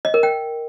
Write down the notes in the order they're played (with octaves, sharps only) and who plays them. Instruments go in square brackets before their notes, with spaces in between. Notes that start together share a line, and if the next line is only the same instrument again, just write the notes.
[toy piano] D#5
A#4
G5